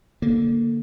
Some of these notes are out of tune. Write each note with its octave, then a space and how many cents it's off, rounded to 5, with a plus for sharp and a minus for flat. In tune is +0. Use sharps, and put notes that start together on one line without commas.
D3 +0 A#3 +0